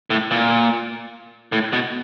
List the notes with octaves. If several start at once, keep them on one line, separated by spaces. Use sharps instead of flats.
A2
A#2
A2
B2